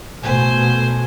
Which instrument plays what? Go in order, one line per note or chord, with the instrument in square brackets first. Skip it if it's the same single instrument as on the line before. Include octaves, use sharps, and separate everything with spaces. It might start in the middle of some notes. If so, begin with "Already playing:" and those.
[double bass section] B2 A3 [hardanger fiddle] C5 [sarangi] G#5